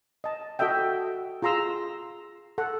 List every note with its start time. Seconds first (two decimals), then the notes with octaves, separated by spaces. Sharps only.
0.24 D#5 A5
0.59 F#4 A4 D#5 E5 G5
1.42 F4 G#4 A#5 C6 E6
2.58 A4 F#5